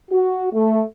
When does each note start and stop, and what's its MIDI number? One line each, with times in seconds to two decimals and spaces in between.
0.11 0.48 66
0.53 0.82 57